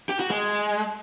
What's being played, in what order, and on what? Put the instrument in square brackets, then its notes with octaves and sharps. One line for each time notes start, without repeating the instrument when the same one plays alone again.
[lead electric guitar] G4
F#4
G#3